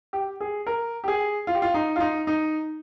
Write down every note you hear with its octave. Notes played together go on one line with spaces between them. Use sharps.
G4
G#4
A#4
G4
G#4
F4
G4
F4
D#4
F4
D#4
D#4